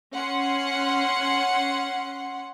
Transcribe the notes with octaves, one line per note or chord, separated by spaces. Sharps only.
C#4 F#5 C6